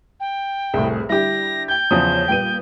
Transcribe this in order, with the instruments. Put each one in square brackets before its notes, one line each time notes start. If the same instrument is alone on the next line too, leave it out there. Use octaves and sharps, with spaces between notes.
[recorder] G5
[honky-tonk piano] F1 G#4 [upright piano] C2 A2
[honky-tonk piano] D3 G3 [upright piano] E4 G4 [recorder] A#6
[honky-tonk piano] G5 G#6 [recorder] G6
[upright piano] E2 F3 D#6 [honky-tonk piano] C#3 F#3 C#4
[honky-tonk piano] A#2 G3 B3 [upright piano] G5 D#7